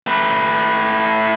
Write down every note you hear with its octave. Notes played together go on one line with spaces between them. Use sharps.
A3 B4